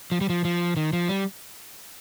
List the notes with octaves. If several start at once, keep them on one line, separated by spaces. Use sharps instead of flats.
F3
G3
F3
F3
D#3
F3
G3